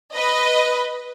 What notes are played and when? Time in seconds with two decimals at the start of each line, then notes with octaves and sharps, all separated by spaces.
0.14 B4 D#5